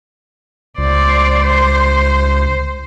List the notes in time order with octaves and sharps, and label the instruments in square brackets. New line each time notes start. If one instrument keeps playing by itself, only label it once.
[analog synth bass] C#2 [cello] C5 D5
[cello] C5